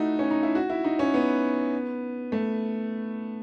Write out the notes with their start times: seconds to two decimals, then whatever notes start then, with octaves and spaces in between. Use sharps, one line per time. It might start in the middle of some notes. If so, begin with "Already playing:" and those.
Already playing: A3 D#4 E4 F#4
0.19 C#4
0.31 D#4
0.43 E4
0.55 F#4
0.70 E4
0.84 D#4
0.99 C#4
1.14 B3
2.32 A3